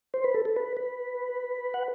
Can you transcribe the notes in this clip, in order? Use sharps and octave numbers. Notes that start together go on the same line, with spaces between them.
C5
B4
A4
A4
B4
B4
F#5